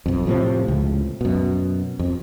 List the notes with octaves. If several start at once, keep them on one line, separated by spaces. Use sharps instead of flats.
B1 F2
A2 C3 F3
C#2
F#2 B2
F2